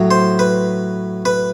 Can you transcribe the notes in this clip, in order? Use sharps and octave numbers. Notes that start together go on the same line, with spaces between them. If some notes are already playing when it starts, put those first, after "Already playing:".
Already playing: A2 F#3
C5
B4
B4